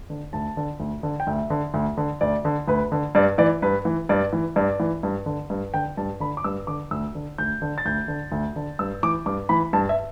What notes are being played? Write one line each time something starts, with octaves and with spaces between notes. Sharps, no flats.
D3
D2 A5
D3
D2
D3
G5
D2 E5
D3
D2
D3
D2 D5
D3
D2 B4
D3
G2 D5
E3 D5
G2 B4
E3
G2 D5
E3
G2 D5
E3
G2
D3
G2
D3 G5
G2 A5
D3 B5
D6
G2 E6
D3 D6
D2 E6
D3
D2 G6
D3
A6
D2 G6
D3
D2
D3
G2 E6
E3 D6
G2 D6
E3 B5
G2 A5
E5